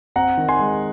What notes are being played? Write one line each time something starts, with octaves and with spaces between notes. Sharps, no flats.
C4 F#5 A#5
D#3
G#5 C6
G#3